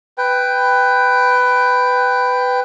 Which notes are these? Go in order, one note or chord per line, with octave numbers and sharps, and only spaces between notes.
B4 G5